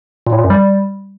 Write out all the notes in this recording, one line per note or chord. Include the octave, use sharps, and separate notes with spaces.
A#2
A2
A#2
F#2
G3